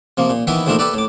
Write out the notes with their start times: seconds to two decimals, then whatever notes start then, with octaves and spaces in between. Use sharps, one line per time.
0.17 C3 F3 A#3
0.30 A#2
0.47 D#3 E3 B3 E4 B4
0.67 A#1 D#3 F3 A3 D4 A#4
0.79 G4 A4 B4 D5
0.94 A2 D6